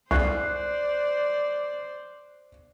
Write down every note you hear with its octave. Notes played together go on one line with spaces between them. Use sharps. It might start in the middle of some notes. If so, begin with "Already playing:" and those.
C2 C5 D5 F#6 C7